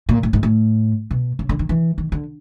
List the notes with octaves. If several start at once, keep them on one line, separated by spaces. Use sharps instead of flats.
A#2
A2
G#2
A2
B2
C#3
D3
D#3
E3
D#3
D3